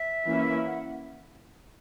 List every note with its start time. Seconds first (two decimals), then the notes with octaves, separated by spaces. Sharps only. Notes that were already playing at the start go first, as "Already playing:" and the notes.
Already playing: E5
0.26 E3 A#3 C#4 E4
0.67 F#5